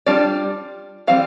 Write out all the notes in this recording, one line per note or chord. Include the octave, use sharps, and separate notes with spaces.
G3 D4 F4 D5
E3 G3 C4 F5